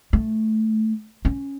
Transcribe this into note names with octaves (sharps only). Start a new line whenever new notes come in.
A3
C#4